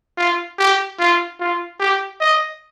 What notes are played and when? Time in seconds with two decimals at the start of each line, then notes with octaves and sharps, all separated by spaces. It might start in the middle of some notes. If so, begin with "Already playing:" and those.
0.17 F4
0.59 G4
0.99 F4
1.40 F4
1.80 G4
2.21 D#5